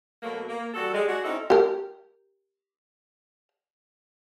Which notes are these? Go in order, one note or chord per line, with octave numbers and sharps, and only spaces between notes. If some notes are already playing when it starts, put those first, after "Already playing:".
B2 F#3 A3 A#3
A#3
E3 G3 F#4 A4
G3 G#3
G#3 D4 F#4
C4 C#4 D#4 E4 A4
G4 A#4